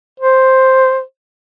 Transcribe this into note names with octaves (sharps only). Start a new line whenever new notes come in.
C5